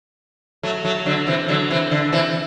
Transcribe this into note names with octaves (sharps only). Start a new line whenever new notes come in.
F#3 A3
F#3 A3
D3 F#3
C3 E3
D3 F#3
C3 E3
D3
C3 E3